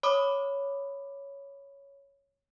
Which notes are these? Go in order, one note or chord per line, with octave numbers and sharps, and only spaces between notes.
C#5 B5 D6 D#6